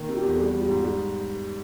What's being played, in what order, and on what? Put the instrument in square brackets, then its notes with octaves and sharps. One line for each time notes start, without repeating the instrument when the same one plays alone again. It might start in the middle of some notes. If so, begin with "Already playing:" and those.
Already playing: [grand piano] A#2 D#3
C3
[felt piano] F4 G4
[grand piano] E2
[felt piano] A4
[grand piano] G3 [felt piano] F#4 G#4
[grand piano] G3
[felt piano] F4 G4
[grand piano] G#2
[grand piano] G3 [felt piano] F#4 G#4